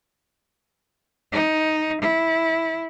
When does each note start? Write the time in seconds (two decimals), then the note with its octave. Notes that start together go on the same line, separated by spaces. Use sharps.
1.33 D#4
2.01 E4